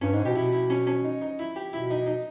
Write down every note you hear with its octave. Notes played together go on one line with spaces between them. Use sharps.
G2 C#4
G#2 D#4
B2 G4
B2 E4
E4
C#4
C#4
D#4
D#4
E4
G4
B2 E4
D#4
D#4